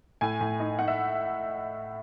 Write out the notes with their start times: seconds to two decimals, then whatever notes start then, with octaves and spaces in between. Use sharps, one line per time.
0.21 A2 G#5
0.41 A2
0.60 D#4
0.79 D#4 F#5
0.88 E5